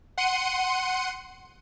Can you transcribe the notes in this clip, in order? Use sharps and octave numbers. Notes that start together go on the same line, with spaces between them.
F#5 C6 C#7 D#7